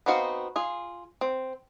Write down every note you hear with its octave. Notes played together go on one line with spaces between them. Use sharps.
B3 C4 D#4 F#4 F5
F4 G#4
C4